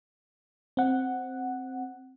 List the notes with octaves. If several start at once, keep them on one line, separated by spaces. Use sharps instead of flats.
C4 F#5